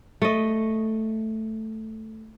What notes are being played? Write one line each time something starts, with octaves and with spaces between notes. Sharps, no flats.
A3 D#5